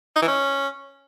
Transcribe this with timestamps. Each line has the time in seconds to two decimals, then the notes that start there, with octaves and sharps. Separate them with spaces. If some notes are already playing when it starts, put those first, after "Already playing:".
0.16 D#4
0.22 E3
0.28 C#4